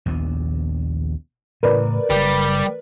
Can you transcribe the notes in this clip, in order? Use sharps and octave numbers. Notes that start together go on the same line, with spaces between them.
A#1 D#2 B3
A2 C#3 E3 A#4 B4 D5
F#1 G3